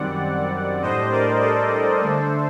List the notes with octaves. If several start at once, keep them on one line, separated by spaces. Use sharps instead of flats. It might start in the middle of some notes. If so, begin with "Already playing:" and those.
Already playing: F#2 D#3 G3 C4 D5 F#5
A2 G3 D4 C5 D#5
A#4 D5
A4 C5
D3 A3 D4